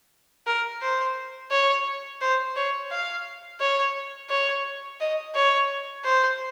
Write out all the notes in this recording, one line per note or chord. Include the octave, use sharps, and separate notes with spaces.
A#4
C5
C#5
C5
C#5
F5
C#5
C#5
D#5
C#5
C5